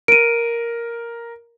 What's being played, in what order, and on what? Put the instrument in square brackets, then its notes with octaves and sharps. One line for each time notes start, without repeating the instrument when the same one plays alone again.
[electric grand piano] A#4 [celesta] D7 D#7